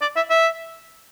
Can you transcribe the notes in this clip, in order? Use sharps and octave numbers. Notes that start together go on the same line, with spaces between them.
D5
E5
E5